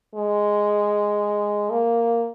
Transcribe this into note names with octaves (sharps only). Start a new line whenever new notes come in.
G#3
A#3